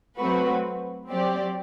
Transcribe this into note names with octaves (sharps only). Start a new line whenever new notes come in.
F#3 A3 C4 F#4 B4
F#3 C4 G4 D5